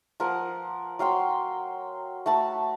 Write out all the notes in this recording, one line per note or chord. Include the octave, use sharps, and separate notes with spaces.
F3 A#4 F#5
F#3 F5 G5 C6
A3 F#4 A5 B5